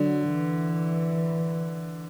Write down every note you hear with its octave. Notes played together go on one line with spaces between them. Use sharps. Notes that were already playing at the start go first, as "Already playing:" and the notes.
Already playing: D3 F#3
E3